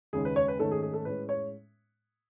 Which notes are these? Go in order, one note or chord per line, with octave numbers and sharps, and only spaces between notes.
D#2 C#3 G#3 C#4 G#4
B4
C#5
B4
G#2 D#3 A3 C#4 A4
G#4
G#4
A4
A2 G#3 C#4 B4
C#5